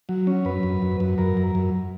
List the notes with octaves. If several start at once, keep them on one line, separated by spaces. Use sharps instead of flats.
F#3
C#4
F#2 B4
F#2
F#2
F#2
F#2 A#4
F#2
F#2